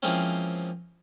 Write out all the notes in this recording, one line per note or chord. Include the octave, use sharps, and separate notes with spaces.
E3 F3 G#3 A#3 C4 C#4